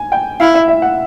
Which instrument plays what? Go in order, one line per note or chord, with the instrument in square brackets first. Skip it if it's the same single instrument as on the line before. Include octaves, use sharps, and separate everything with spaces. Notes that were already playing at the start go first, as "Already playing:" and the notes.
Already playing: [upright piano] G#5
G5
[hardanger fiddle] E4 [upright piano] F5
[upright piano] E5
E5
F#5